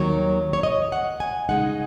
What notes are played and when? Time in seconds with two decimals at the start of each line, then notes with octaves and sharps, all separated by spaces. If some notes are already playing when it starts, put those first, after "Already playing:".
Already playing: D#2 D#3 F#3 C#5
0.53 C#5
0.63 D#5
0.92 F#5
1.20 G#5
1.49 C#3 G#3 D#4 F#5